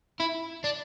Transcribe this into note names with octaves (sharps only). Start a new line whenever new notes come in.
E4
D4